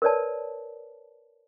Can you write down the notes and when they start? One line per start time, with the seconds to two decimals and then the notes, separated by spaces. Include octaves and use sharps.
0.02 A#4 B4 C#5 D5 A5